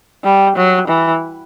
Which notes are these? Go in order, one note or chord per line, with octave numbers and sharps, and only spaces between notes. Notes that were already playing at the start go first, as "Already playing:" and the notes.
G3
F#3
E3